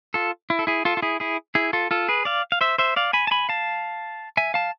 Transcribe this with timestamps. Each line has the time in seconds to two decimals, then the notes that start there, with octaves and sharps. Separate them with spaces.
0.14 F4 A4
0.50 E4
0.59 A4
0.67 E4 G#4
0.85 F4 A4
0.97 F4
1.02 E4 G#4
1.20 E4 G#4
1.55 E4 G#4
1.73 F4 A4
1.91 F4 A4
2.09 G#4 B4
2.25 D5 F5
2.52 F5
2.61 C5 E5
2.78 C5 E5
2.96 D5 F5
3.13 G#5 B5
3.27 A5
3.31 G#5 B5
3.49 F5 A5
4.37 E5 G#5
4.54 F5 A5